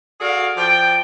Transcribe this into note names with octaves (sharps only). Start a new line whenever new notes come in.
F#4 G#4 A4 D5 F5
F3 D5 G5